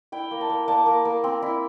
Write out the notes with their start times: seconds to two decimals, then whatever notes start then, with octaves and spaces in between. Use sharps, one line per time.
0.12 E4 G5
0.31 A#3
0.41 A5
0.50 A#3
0.68 A#3 A5
0.86 A#3
1.05 A#3
1.24 C4
1.42 E4